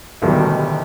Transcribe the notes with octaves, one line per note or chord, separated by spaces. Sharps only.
A1 D2 B2 D#3 F#3 G3